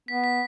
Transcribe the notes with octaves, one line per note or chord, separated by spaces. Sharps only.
B3 B6
B6